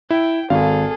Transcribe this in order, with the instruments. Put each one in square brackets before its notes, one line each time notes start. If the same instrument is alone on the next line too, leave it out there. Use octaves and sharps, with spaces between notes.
[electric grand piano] E4 [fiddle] G5
[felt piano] G#1 [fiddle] G#4 A4 [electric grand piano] F5